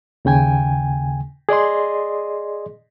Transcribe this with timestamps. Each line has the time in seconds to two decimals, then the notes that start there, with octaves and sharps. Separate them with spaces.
0.25 D#2 C#3 G5 G#5
1.49 G#4 D5 D#5 C6